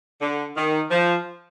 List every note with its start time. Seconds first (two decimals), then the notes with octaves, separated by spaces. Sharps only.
0.20 D3
0.56 D#3
0.90 F3